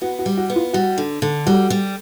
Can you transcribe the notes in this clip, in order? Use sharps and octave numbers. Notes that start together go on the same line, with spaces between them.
B3 F#4
F#4
G3
F#4
B3
F4
G3 F#4
D3
D3
G3 F#4
G3